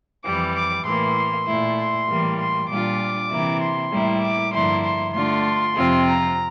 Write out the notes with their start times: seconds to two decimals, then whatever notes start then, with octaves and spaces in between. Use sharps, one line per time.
0.24 F2 E3 G3 D6
0.55 D6
0.85 A2 E3 A#3 C6
1.47 A#2 A3 E4
1.78 C6
2.08 A2 E3 G3 A#3
2.39 C6
2.69 A#2 G3 D4 F4 D6
3.31 C3 E3 A#3 E4
3.61 C6
3.92 A2 G3 A#3 E4
4.22 D6
4.53 G2 D3 F3 A#3 E4 C6
4.83 C6
5.14 D3 A3 D4 F4 C6
5.76 F2 C3 F3 C4 F4
6.07 A#5